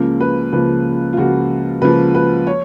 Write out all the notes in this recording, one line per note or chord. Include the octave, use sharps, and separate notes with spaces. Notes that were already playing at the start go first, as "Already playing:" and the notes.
Already playing: C#2 C#3 F3 A#3
B4
C#2 C#3 F3 A#3 B4
F4
C#2 C#3 F3 A#3 F#4
C#2 C#3 F3 A#3 B4
B4
C#5